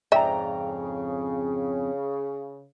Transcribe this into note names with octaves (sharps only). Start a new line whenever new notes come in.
F2 G#2 C#3 D5 E5 G5 A#5